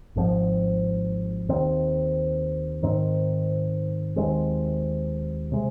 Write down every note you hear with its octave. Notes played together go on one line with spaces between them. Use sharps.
G#1 G#2 F3 C4
D#2 D#3 C4
G#2 D#3 C4
D#2 D#3 G#3 C4
C3 G#3